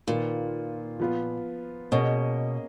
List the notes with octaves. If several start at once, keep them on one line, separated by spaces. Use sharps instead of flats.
A#2 D#3 A#3 F4 B4
F3 B3 F4
B2 A#3 C#4 G#4 D#5